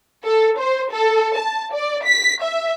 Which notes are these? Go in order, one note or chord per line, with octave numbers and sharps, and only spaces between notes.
A4
C5
A4
A5
D5
B6
E5